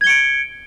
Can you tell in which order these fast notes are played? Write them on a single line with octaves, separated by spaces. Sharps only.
G#6 G7 C#7 D7